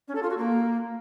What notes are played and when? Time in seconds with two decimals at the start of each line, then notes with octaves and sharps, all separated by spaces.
0.08 C#4
0.15 A4
0.23 F4
0.30 F#4
0.37 A#3